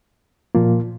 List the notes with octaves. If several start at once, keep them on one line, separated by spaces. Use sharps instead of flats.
A#2 F3 A#3 F4